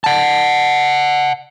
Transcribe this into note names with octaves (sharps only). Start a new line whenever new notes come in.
F#5 A5